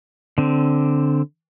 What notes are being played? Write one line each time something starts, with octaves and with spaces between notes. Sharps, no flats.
D3 C4